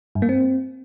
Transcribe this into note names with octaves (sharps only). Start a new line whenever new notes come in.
G2
A#3
C4